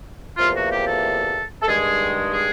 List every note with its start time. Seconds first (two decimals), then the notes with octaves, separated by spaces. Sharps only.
0.37 E2 C3 F3 A#3 F4
0.54 F#4
0.70 G4
0.86 A4
1.62 A4
1.67 G2 D#3 G#3 G#4
2.32 G#4